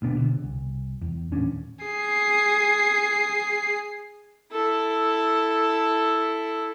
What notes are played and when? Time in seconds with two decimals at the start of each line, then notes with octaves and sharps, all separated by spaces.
0.02 D2 B2 B3 D4
0.15 B2 D3
0.44 C2
1.02 E2
1.32 D#1 A1 C#4 D4
1.85 G#4 C7
4.52 E4 A4